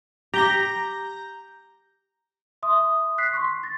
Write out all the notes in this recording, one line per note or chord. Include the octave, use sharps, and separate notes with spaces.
G4 A#5 G6 A#6
E5 C6 D#6
F#6 B6 C7
C6 C#6
A6 A#6